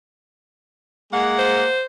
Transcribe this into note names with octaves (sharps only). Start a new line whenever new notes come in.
G#3 A#3 F#5
C5